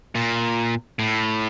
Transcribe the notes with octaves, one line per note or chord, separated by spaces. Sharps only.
A#2
A2